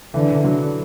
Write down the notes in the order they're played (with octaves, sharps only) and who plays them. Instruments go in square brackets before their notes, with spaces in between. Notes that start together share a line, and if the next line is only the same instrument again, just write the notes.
[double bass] D3 [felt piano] E3
[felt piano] D3 F#3